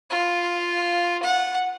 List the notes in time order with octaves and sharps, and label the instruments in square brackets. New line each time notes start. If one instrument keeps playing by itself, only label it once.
[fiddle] F4
F#5